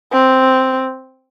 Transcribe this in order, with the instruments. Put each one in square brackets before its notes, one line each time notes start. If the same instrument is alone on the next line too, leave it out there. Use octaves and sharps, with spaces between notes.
[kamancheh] C4